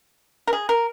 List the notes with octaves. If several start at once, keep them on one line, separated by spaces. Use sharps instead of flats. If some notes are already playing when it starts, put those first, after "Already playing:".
A#4
G#4
A#4